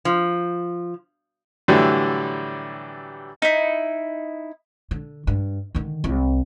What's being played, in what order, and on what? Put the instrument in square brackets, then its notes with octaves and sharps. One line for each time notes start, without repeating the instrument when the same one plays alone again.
[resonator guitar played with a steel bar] F3
[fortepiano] A2 D3 E3 F#3 G3
[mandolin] D#4 E4
[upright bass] D3
G2
D3 D#3
C2